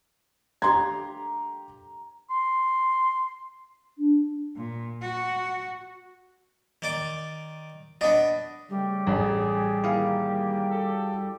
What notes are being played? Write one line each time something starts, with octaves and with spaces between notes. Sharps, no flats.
G4 A#5 C6 G#6
C6
D4
A#2
F#4
D#3 D5 D6
B3 D4 D#5
C#3 G3 A3
A1 G#4
D#3 A#3 E4 G#4 F5
F#4 A4